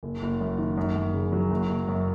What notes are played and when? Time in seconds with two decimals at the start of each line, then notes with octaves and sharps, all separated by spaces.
0.03 F#1
0.22 F#1
0.41 F#2
0.58 D#3
0.77 F#2
0.95 F#2
1.14 C#3
1.32 F#3
1.51 F#1
1.69 F#1
1.88 F#2